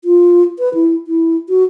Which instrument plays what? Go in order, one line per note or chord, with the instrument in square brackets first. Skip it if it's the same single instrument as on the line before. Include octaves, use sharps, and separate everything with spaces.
[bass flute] F4
B4
E4
E4
F#4